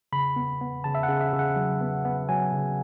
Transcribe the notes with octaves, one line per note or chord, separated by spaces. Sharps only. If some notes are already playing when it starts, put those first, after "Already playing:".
C#3 B5
B3
B3
C#3 A5
E5
F#5
C#3
E5
C#3
F#5
F#3
B3
B3
F#3 G#5
C#3